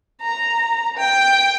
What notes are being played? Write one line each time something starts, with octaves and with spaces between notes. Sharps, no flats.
A#5
G5